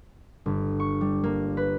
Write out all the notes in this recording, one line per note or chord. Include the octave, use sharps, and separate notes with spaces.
G1
C#6
G3
A#3
B4